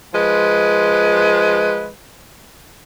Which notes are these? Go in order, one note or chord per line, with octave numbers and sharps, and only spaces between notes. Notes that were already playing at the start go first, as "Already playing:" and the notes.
F3 G#3 B4